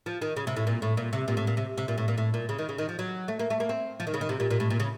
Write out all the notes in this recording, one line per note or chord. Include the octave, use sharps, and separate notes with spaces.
F3
D#3
C#3
C3
A2
A#2
A2
A#2
C3
A#2
A2
A#2
C3
C3
A#2
A2
A#2
A2
A#2
C#3
D#3
C#3
D#3
F3
F#3
A3
A#3
A3
A#3
C4
F3
D#3
C#3
D#3
C3
A#2
A#2
A2
A#2
C#3